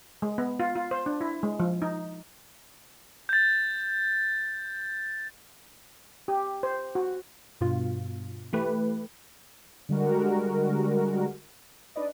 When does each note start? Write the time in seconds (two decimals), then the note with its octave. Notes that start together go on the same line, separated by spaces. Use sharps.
0.22 G#3
0.38 B3
0.60 F4
0.75 F4
0.91 C5
1.06 D4
1.21 E4
1.43 G#3
1.60 F3
1.82 D#4
3.29 G6 A6
6.28 G4
6.63 C5
6.95 F#4
7.61 G2 B2 F4
8.53 E3 A3 G4 B4
9.89 D3 G3 G#3 F#4 A#4
11.96 D4 D#4 B4 D5 D#5